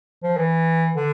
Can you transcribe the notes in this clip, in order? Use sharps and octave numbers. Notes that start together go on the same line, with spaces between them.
F3
E3
D3